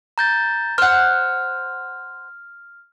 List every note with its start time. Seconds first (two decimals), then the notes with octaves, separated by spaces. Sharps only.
0.18 A#5 G6 A6
0.78 C5 F#5 F6